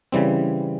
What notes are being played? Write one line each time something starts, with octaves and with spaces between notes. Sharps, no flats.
C#3 E3 G3 C4